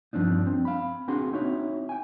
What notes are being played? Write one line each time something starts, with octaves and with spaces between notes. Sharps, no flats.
G2 F3 C4 D4 D#4
C4
F5 B5
C4 D4 F#4 G#4 C6
C4 D#4 E4 F#4 C#5
G5 G#5